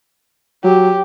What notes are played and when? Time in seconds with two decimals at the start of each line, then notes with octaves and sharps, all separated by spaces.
0.64 F#3 G4